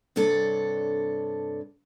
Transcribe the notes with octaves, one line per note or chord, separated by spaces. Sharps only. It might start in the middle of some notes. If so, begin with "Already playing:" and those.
G2 C3 D4 A4 C#5